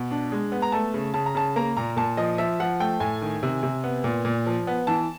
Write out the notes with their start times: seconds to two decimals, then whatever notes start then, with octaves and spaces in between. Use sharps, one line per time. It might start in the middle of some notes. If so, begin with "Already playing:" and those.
Already playing: B2
0.11 D4
0.32 G#3
0.52 B3
0.62 A#5
0.72 A3 A5
0.94 C#3
1.14 C#3 A5
1.26 A#5
1.35 C#3 A5
1.56 A#3 A#5
1.77 A#2 A#5
1.97 A#2 A5
2.17 F3 D#5
2.38 F3 E5
2.60 F3 F#5
2.80 A3 G5
3.00 A2 G#5
3.22 D#3
3.43 C3
3.63 C3
3.84 B3
4.04 A#2
4.25 A#2
4.47 F3
4.67 B3
4.87 E3 A5